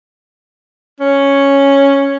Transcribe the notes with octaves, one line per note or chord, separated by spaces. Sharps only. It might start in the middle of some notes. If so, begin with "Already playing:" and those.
C#4